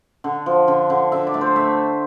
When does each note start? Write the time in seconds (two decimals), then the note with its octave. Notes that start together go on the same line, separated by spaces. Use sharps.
0.24 D3
0.46 F3
0.68 D3
0.90 D3
1.12 D3 E5
1.27 D5
1.34 A3
1.41 C5
1.56 A3 E5